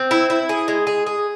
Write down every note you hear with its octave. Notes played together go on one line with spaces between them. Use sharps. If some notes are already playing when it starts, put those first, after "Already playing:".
Already playing: C4
E4
E4
G#4
G#3
G#4
G#4